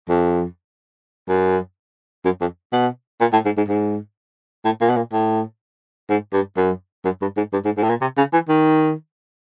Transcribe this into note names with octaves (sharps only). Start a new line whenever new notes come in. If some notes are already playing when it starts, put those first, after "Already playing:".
F2
F#2
F#2
F2
B2
A#2
A2
G#2
G#2
G#2
A2
A#2
B2
A#2
A2
G#2
G2
F#2
F#2
G2
G#2
G2
G#2
G#2
A2
A#2
C3
C#3
E3
D#3